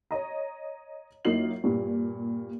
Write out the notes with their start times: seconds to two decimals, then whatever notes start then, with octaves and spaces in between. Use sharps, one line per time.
0.11 C#5 D#5 A#5
1.25 F#2 A#3 D#4 F4 C7 F#7
1.64 G2 A#2